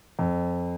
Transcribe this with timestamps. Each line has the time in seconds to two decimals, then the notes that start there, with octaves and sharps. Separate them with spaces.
0.19 F2